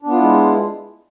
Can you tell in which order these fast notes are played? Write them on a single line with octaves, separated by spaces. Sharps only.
D4 B3 F4 E4 G#3